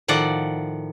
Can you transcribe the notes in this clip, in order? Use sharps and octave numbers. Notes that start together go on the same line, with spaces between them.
A2 D#3 F3 D5 F#5